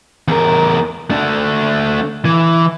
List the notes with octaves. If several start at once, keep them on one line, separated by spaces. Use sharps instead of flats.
E2 A#4
A3 D4
E3